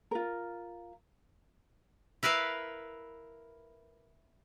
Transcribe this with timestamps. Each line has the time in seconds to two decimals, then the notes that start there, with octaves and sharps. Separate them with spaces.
0.11 F4 A#4
2.23 E4 A#4 B4 E5 F5